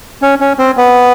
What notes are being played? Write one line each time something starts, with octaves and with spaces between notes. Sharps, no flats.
C#4
C#4
C4
B3